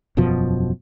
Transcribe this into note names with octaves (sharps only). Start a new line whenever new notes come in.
E1 F#2 B2 F3